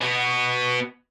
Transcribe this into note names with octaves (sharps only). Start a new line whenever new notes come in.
B2 B3